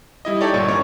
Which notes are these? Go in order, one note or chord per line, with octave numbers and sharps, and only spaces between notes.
G3 E4 D#5
D#4 G4 A4 C#5 D5
G1 A#2 C#6
A#3 C#4 C#5